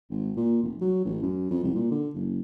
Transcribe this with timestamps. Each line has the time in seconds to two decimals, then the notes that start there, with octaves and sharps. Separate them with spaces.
0.10 G#1
0.37 A#2
0.63 F1
0.81 F#3
1.05 A1
1.22 F#2
1.51 F2
1.64 C2
1.75 A#2
1.91 D3
2.15 F#1